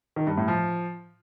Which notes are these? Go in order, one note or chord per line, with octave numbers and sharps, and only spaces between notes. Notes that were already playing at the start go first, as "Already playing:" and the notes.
D#3
G2
A2
F3